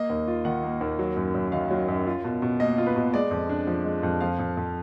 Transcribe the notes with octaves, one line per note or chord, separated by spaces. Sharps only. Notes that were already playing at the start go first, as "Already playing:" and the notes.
Already playing: A#3 D#5
D#2
F4
D#3 F#5
A#3
D#2
F#3
F#2
F#2
D#3 F5
F#3
F#2
F4
B2
B2
A#3 D#5
F4
B4
B2
G#3 D5
F2
D4
F3
G#3
F2
F3 F5
F2
F2